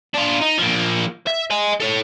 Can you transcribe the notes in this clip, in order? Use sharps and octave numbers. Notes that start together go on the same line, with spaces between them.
D4 F4
D#4
F3 A#3
E5
D#5 G#5
A4 C#5